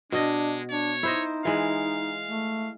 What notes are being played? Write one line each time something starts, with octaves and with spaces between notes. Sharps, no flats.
B2 G#3 D4 D#5
D4 C#5
D#4 E4 C5 D#5
E3 G#3 F5
A3